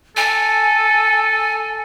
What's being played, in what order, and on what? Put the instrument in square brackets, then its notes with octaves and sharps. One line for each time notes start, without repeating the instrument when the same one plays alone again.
[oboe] A4 [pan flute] G#5